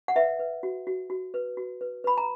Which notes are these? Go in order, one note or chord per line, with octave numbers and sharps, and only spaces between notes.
F#5
B4 E5
B4
F#4
F#4
F#4
B4
F#4
B4
B4 B5
A#5